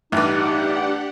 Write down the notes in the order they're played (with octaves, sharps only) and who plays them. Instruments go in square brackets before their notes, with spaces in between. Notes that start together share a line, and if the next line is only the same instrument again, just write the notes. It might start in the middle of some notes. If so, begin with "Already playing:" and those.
[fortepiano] A1 G2 [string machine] D4 G4 F#5 [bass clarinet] D#4